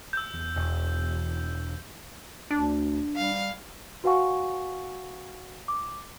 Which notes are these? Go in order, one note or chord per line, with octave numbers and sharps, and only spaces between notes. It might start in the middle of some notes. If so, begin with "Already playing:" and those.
E6 G6
E2
E1
D2 D4
G3 F5
F#4 B4 F5 F#5 G#5 C#6
D6